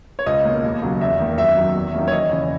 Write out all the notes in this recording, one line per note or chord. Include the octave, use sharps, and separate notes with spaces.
C#5
C#2 D#5
B2 A#3
D#2
C#3 F#3
E2 E5
D#3 A#3
F#2 E5
D#3 F#3
E2
D#3 F#3 A#3 C#4
C#5
E2 D#5
C#3 E3